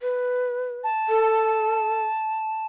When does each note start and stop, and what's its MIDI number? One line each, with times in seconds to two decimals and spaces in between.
0.01 0.80 71
0.83 2.66 81
1.09 2.04 69